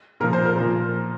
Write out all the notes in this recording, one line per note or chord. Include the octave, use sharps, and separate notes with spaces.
A#2 F3 A#4
C5
A#4
A#2 F3